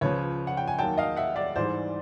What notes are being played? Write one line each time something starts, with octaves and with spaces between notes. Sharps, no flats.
C#2 C#3 F3 B4 C#5
F#5
G5
G#5
D#2 D#3 F#3 G5 A5
D#5 F5
E5 F#5
D5 E5
G#2 E3 G3 C5 D5